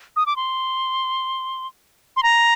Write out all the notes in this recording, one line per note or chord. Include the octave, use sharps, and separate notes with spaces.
D#6
D6
C6
C6
A#5